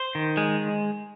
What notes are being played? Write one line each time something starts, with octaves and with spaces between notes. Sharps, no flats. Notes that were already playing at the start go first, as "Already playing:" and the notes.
Already playing: C5
D#3
G#3